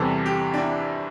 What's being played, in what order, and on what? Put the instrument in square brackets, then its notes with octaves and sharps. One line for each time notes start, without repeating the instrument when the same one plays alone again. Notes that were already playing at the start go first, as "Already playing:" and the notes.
Already playing: [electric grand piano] E2 C3 E3 G3 [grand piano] A4
[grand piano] G4
D4
E4